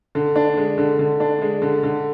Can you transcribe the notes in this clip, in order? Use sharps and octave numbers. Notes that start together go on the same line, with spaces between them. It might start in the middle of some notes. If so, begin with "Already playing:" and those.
D3
D4
G#3
D3
D3
D4
G#3
D3
D3